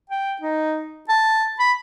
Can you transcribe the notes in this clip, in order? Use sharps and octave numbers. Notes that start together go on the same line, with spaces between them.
G5
D#4
A5
B5